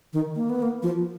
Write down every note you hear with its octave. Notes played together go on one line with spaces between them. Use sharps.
D#3
A#3
B3
A#3
F3